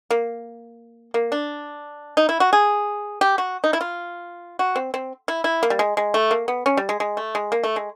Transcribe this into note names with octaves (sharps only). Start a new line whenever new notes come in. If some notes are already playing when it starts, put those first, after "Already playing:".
A#3
A#3
D4
D#4
E4
F#4
G#4
G4
F#4
D#4
E4
F4
F#4
C4
C4
E4
E4
A#3
G3
G#3
G#3
A3
A#3
B3
C#4
G3
G#3
G#3
A3
G#3
A#3
A3
G#3